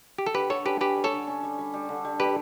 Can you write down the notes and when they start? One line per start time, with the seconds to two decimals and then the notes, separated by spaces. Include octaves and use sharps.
0.18 G4
0.26 A4
0.35 D3 G4 B4
0.50 D3 A4 C#5
0.66 C#4 G4 B4
0.81 C#4 G4 B4
0.96 G3
1.04 A4 C#5
1.12 D3
1.27 C#4
1.43 G3
1.59 G3
1.74 G3
1.89 D3
2.05 G3
2.20 G3 G4 B4